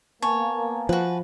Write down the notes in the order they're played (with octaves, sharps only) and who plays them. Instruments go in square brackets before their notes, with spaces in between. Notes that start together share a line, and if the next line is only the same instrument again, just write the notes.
[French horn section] A#3 B3 [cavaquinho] C#5 [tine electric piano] G#5 A5
[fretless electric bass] F3 [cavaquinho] F#4 B4